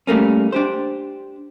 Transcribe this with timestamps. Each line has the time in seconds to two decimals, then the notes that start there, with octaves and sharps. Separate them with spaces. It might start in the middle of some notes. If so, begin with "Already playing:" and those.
0.07 G3 A3 A#3 C#4
0.52 D4 G4 C5